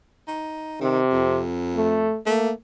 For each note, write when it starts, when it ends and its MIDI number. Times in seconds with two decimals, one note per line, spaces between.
0.28 0.78 63
0.81 1.42 48
0.81 1.00 51
1.12 2.13 41
1.76 2.18 57
2.26 2.51 57
2.26 2.52 58